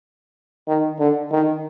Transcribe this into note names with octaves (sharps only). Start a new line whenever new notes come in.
D#3
D3
D#3